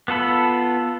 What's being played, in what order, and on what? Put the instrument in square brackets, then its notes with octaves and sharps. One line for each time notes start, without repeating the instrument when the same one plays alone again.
[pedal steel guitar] B3 F4 A4 B5